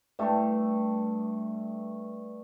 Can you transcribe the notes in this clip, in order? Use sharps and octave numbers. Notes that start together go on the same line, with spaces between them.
G2 G3 A3